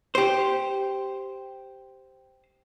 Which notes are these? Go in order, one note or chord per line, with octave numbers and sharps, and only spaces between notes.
G4 C5